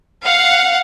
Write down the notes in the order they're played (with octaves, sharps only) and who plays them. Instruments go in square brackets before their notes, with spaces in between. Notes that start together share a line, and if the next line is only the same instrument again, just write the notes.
[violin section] F5 F#5